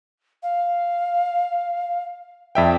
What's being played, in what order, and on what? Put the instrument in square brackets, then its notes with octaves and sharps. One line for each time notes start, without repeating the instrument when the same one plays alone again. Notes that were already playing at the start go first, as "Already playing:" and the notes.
[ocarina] F5
[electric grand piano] F2 E5 G5 [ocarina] D5